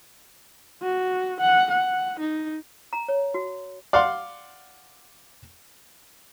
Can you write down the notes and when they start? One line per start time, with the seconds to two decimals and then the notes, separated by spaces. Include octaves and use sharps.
0.82 F#4
1.40 F#5
1.71 F#5
2.20 D#4
2.93 A#5
3.08 C#5
3.34 F#4
3.93 D5 F5 F#5 C6